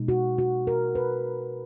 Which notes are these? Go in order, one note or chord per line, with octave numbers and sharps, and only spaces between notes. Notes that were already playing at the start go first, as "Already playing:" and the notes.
Already playing: B2 G#3 D#4
F#4
F#4
A#4
B4